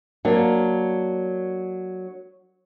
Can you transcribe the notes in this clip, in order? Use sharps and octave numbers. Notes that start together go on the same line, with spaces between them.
F#3 A#3 D4